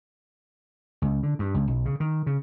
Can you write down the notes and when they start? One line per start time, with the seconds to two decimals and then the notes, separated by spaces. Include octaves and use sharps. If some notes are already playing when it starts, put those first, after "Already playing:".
1.02 C#2
1.23 D3
1.39 G2
1.54 C#2
1.67 B1
1.85 C#3
2.00 D#3
2.27 C#3